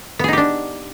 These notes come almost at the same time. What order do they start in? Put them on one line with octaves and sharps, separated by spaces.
B3 G#4 D#4 G4 D4